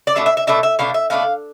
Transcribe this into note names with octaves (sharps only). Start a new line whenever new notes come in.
D5
B2 A3 D4 E5
E5
E5
B2 A3 D4 E5
E5
B2 A3 D4 F5
E5
B2 A3 D4 F5